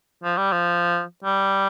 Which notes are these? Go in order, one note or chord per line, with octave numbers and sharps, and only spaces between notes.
F3
G3
F3
G3